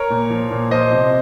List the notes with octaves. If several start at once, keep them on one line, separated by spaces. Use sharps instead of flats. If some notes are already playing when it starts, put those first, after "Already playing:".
Already playing: A#4 C#5
A#2
F3
A#2
F3 C5 D#5
C3